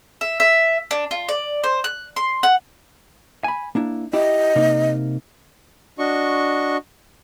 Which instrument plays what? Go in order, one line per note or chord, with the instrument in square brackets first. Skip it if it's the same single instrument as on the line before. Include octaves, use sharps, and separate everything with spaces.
[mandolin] E5
E5
D4
F4
D5
C5
F#6
C6
F#5
[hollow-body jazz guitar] G#5 B5
A#3 D4 E4
[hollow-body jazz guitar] E4 G4 [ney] D#5
[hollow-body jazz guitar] C3 A#3 D#4
[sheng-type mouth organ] D4 F#4 D#5 C#6